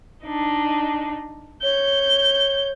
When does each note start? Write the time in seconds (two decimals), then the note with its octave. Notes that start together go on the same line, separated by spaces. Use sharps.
0.25 D4 D#4
1.63 C#5 G6